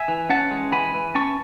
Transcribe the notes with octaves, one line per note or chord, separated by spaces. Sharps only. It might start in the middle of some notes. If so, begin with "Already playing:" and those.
Already playing: E5 G#5
E3
C#4 F#5 A5
G#3
E3 G#5 B5
E3
C#4 A5 C#6